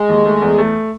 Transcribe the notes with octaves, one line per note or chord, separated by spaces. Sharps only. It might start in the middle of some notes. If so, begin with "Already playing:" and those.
Already playing: G#3
D#2
A3
E2
A3